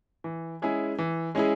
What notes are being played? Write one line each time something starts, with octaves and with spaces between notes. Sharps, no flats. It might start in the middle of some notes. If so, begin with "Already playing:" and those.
E3
G#3 C#4 E4 G#4
E3
G#3 C#4 E4 G#4